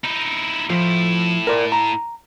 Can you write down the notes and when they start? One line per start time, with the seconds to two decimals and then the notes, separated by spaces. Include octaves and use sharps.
0.04 D#4 E4
0.70 A2 F3 E4
1.47 A#4 D5
1.72 A#5